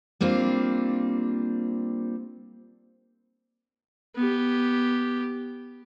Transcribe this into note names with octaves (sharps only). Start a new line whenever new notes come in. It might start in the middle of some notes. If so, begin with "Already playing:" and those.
G3 A#3 C4 D4 F4
B3 G4